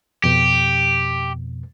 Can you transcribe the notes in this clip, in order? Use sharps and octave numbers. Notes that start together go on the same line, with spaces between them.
F2 B2 G4